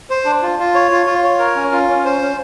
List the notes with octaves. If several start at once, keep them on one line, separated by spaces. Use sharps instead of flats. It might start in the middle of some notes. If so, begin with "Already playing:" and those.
C5
D4
F4
F4
C#5
F4
F4
C#5
A#4
C#4
F4
C#4
C5
C#4